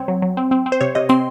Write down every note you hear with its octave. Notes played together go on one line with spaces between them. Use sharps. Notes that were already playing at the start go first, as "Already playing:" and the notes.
Already playing: C2 C4 C#5
F#3
F#3
C4
C4
C4
C5
C3 C#5
C3 D#5
C4 C6